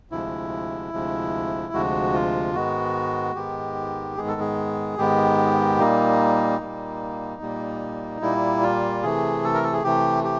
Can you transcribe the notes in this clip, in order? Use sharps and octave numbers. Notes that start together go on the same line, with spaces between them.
D2 C3 F3 G#3 E4
D2 C3 F3 G#3
D2 C3 F3 G#3 F#4
F4
G#2 D#3 G#3 B3 F#4
G#2 D#3 G#3 B3 G4
G#2 D#3 G#3 B3 G#4
A4
G#4
G#2 D#3 G#3 B3 G4
A#2 G3 A#3 D#4
A#2 G3 A#3
A#2 G3 A#3
A#2 G3 A#3 E4
F4
C3 E3 A3 G#4
A4
A#4
A4
G#4
C3 E3 A3 G4
G4